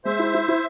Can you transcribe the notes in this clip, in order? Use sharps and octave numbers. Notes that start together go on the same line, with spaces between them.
G#3 C5 E5
E4
E4
E4